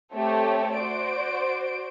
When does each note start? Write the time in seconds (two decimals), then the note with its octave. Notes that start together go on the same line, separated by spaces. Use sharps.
0.14 A3 C4 G4 A4 C#5
0.78 F#4 C5 D5 D7